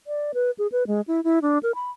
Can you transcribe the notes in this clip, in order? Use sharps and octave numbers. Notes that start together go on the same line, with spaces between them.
D5
B4
G#4
B4
G#3
E4
E4
D4
A#4
B5